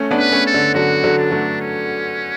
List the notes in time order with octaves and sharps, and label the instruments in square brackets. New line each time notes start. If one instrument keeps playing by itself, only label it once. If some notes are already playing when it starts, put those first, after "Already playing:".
Already playing: [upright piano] A3 C#4
B3 D4
[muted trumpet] B4
[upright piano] A3 C#4
[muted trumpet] A4
[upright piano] D3
[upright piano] D3 F#3 [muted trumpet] F#4
[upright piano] D3 F#3
[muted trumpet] D4
[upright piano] F#3 A3
[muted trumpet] C#4